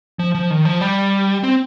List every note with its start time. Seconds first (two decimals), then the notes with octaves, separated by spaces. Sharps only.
0.19 F3
0.34 F3
0.50 D#3
0.65 F3
0.81 G3
1.43 C4